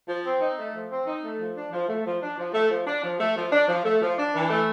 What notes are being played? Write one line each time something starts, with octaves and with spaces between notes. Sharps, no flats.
F3
C4
D#4
A3
F3
C4
D#4
A3
F3
D4
F3
A3
F3
D4
F3
A3
F3
D4
F3
A3
F3
D4
F3
A3
F3
D4
E3
A3